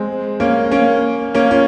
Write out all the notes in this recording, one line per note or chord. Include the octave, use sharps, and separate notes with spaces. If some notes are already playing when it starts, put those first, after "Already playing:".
Already playing: G#3 C4
A#3 C#4
A#3 C#4
A#3 C#4
C#4 F4